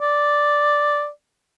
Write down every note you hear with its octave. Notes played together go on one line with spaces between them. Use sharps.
D5